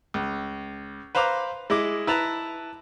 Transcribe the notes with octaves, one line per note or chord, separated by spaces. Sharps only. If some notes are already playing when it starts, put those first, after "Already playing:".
C#2
B4 C5 F5 A#5 D6
G#3 E4 D#5 D6
E4 B4 A5 A#5